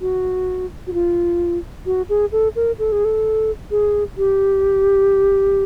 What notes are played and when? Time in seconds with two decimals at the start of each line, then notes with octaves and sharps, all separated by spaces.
0.01 F#4
0.87 F#4
0.93 F4
1.86 F#4
2.09 G#4
2.32 A4
2.56 A#4
2.79 A4
2.92 G#4
3.05 A4
3.71 G#4
4.17 G4